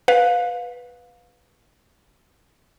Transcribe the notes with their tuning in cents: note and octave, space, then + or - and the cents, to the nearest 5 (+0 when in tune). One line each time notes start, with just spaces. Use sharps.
B4 +0 F5 +25